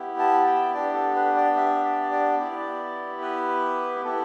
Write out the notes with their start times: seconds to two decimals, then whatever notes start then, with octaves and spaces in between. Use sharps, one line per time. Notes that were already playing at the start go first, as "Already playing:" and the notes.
Already playing: B3 E4 G4
0.19 A5
0.46 G5
0.74 B3 D4 G4 D5
0.94 A4
1.15 B4
1.37 D5
1.57 E5
1.84 D5
2.12 D5
2.39 B3 E4 G4
3.22 B4
4.04 B3 E4 G4 A4